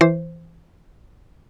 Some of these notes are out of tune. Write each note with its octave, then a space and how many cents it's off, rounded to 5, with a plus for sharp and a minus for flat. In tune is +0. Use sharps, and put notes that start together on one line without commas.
E3 +5 C5 +0